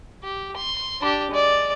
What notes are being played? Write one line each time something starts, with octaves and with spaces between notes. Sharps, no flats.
G4
C6
D4 G4
G#3 D5